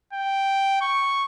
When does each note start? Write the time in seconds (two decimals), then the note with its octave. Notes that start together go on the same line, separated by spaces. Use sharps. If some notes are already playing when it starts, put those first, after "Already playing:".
0.13 G5
0.81 C#6